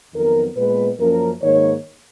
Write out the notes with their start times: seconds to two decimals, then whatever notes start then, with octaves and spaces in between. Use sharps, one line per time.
0.13 F2 D#3 F#3 B3 A#4
0.56 A#2 G#3 B3 B4
0.98 F#2 F3 A#3 C#4 A#4
1.41 G#2 D#3 A#3 C#5